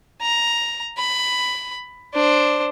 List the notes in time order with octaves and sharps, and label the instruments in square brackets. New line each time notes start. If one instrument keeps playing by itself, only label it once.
[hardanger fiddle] A#5
B5
D4 C5